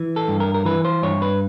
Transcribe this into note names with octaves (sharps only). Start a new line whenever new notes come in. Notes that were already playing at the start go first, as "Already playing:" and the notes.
Already playing: E3
A4
G2
A#4
A#4
E3 B4
C5
G2 C#5
B4